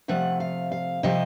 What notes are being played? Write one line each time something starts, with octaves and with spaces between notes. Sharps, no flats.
C3 F3 A3 F#5
F5
F5
C3 F3 A3 D#5